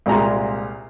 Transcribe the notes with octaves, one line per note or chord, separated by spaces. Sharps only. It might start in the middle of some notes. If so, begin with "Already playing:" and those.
C2 A#2 G#3 F4 A#5 C6